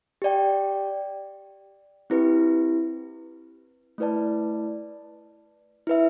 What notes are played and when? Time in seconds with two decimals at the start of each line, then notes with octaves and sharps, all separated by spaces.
0.22 G4 D5 G5
2.10 C4 E4 G4 B4
3.98 A3 E4 B4 D5 A5
5.87 E4 B4 E5